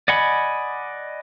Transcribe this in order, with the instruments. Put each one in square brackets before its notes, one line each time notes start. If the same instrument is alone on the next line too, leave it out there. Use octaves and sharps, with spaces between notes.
[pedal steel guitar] D5 D#5 F#5 G#5 B5